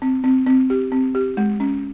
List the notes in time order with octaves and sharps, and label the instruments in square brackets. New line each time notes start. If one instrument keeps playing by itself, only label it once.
[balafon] C4
C4
C4
G4
C4
G4
G#3
C#4